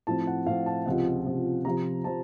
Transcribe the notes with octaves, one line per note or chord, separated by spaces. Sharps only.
A2 F3 C4 A5
F#5
A2 F3 C4 F5
A5
C#2 C3 F3 F#5
C#2 C3 F3
C3 F3 C4 A#5
C3 F3 C4 A5